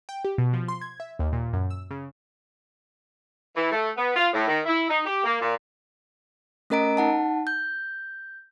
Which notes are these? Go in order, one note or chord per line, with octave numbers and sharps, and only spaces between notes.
G5
G4
B2
F3
C6
G#6
E5
D#2
A#2
F#2
E6
C#3
E3
A3
B3
F4
A2
D#3
E4
D#4
G4
A#3
A#2
A3 C#4 A#4 D#5 A#5 D7
D#4 F#5 A5
G6